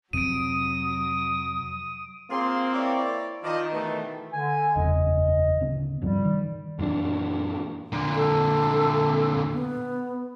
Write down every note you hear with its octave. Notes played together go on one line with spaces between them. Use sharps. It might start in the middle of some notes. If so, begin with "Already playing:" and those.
F2 C3 F#3 D#6 D7 D#7
A#3 C4 F4 G#4 C6
E4 C#5 D5
D#3 F3 D5 D#5
B2 E3 A3
D3 G#5
F#1 E2 C#3 D#5
D1 C#3 B3
G2 C3 F3 G3
D#3
F#2 A#2 E3 D4
A#2 D3
A4
B3